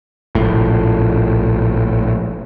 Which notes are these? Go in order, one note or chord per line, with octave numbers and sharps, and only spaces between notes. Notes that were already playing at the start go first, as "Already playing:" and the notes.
F1 A#1 A2